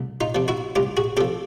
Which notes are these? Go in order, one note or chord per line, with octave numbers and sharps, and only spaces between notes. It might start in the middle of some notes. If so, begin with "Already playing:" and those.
Already playing: C2
D#4 F4
C3 F3
E4 F#4
C2 F4 G4
F#4 G#4
C3 F3 G4 A4